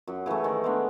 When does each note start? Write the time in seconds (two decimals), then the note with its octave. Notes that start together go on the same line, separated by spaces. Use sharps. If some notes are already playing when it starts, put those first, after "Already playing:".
0.07 F#2
0.26 C#3 E3 A3
0.44 D#3
0.64 G#3 B3 D4